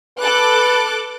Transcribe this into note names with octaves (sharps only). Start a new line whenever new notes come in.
A4 B4 D6 F#6